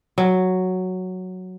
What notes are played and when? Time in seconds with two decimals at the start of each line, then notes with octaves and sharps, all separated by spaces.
0.18 F#3